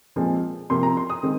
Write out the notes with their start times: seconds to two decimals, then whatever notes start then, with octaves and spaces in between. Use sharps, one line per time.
0.16 A#2 F3 G#3 C4
0.70 C3 F3 A#3 C6
0.83 A#5
0.97 C6
1.10 D#6
1.23 D#3 G#3 C4